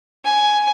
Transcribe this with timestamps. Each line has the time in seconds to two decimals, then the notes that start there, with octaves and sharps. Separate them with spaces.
0.25 G#5